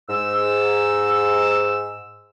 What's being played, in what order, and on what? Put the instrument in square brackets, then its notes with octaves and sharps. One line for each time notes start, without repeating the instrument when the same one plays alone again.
[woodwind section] G#2 E6